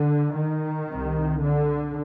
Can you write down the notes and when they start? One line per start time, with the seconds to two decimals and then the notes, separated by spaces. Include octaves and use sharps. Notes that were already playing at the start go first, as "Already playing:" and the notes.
Already playing: D3
0.37 D#3
0.89 C2 C3
1.42 D3